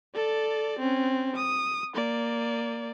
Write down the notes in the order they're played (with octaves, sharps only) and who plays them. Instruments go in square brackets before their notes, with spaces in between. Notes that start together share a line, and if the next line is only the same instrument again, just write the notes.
[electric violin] A4 D5
C4 C#4
D#6
A#3 D5